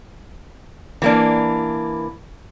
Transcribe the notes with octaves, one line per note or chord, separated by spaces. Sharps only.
E3 A#3 D4